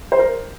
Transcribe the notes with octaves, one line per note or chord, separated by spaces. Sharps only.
C5
A#4